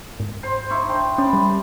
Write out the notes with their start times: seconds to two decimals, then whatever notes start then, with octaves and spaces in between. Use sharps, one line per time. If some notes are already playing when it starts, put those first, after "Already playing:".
0.20 G#2
0.43 C5 C6
0.70 D#4 E4 C#6
0.88 D4 G5 C6
1.18 C#4 D5 B5 C6
1.33 G3